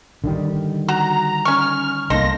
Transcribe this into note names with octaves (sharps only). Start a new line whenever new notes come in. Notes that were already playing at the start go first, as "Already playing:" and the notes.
D3 D#3 G3
F#4 A#5
C#4 C#6 F6
C2 A#3 D#4 A4 C6 A#6